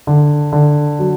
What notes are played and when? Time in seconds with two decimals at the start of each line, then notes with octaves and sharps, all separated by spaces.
0.07 D3
0.53 D3
0.99 F#3